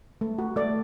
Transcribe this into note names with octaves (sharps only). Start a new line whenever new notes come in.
A3
F#4
A3 D5